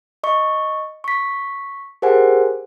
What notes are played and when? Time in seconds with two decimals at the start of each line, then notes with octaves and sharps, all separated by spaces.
0.24 D#5 C#6
1.04 C#6 B6
2.02 G4 G#4 A#4 C5 F#5 G#5